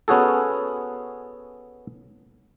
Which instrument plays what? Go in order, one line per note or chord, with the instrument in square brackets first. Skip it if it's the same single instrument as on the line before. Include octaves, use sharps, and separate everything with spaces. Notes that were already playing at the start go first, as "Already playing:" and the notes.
[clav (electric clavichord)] B3 C#4 F#4 G#4 A4